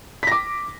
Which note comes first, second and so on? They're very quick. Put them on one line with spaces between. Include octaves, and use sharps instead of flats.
B6 A#6 D6